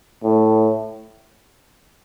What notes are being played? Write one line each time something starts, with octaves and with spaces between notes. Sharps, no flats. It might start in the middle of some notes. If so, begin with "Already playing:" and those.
A2